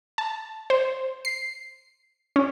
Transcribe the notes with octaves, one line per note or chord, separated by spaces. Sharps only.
A5
C5
C7
C#4